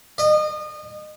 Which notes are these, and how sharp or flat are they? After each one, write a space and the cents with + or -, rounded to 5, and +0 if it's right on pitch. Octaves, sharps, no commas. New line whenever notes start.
D#5 -30